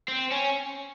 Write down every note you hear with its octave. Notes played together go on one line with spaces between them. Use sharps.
C4
C#4